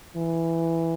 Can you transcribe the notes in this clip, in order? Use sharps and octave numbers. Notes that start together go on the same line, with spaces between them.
E3